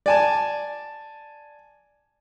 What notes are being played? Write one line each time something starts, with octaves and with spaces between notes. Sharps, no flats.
D5 G#5 A5